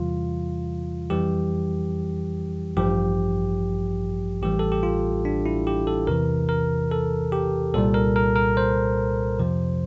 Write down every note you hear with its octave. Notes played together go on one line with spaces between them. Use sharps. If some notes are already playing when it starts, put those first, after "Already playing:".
Already playing: E2 C3 E3 G3 F4
F2 E3 G3 G4
A1 G2 F3 G4
A1 A2 E3 G3 G4
A4
G4
F4
D4
E4
G4
A4
E2 C3 E3 A#4
A#4
A4
G4
C2 A#2 G3 A4
A#4
A#4
A#4
C5
F2 C3 F3